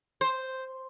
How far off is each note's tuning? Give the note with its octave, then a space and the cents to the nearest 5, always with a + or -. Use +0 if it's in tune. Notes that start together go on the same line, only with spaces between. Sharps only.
C5 +0